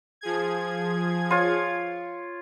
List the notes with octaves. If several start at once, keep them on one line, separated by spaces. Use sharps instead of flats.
F3 G#4 G#6
F4 C#5